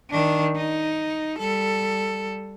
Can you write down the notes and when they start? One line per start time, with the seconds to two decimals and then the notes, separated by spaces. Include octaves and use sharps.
0.11 D#3 D4
0.56 D#4
1.39 G3 A4